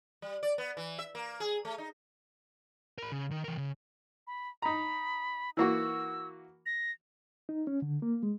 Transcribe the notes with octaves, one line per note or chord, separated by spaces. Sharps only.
G3
D5
B3
E3
E5
A#3
G#4
A3
D#4
A#4 B5
C#3
D#3
E3 A#4
C#3
B5
D#4 A#5 B5
E3 A#3 F#4 E6
A#6
D#4
C#4
D3
A#3
G#3